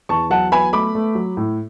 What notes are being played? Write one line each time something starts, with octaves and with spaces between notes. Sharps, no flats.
E2 A5 C#6
F#3 F#5 A5
B3 G#5 B5
A3 B5 D6
A3
F#3
A2